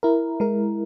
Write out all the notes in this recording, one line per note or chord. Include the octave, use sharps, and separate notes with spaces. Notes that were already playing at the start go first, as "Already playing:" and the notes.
E4 A#4
G#3 A#4